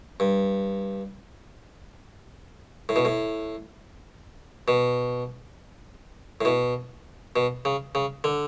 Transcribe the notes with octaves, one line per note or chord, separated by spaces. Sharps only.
G2
A2
B2
A2
B2
A2
B2
B2
C#3
C#3
D3